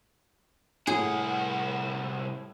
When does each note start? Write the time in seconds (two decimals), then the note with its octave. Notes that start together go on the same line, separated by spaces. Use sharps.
0.87 C2 A2 G#4 F#5